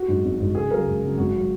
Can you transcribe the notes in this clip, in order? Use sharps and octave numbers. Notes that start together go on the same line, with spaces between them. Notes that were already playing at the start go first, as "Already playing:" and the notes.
Already playing: F#4
G#2 F#3
G#1
G#2 F#3
C#2 G#4
C#3 F#3 A#4
C#2
C#3 F#3
G#1 F#4
F#3